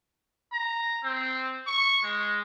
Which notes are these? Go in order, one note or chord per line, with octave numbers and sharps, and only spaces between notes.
A#5
C4
C#6
G#3